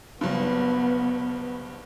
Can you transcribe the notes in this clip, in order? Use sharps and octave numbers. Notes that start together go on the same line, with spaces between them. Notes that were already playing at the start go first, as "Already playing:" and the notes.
F#1 G2 B3